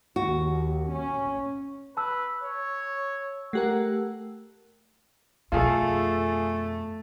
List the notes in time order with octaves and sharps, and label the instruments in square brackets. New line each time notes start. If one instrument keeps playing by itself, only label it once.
[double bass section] D#2 [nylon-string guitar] F#4
[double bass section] C#4
[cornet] B4 [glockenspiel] A5 E6
[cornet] C#5
[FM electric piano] A3 G4 A#4 [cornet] F#5
[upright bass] F2 B2 [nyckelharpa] A3 [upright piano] F4 G#4 A4